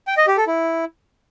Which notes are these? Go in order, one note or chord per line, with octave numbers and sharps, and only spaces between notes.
G5
D#5
G4
A4
E4